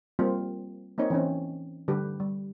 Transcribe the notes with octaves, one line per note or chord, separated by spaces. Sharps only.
G3 A#3 C4 F4
A#3 C4 D#4 C#5
E3 C4 C#4
D3 G3 G4 B4
G3